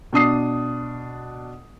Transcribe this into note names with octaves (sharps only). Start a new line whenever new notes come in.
B2 D4 D#6 C7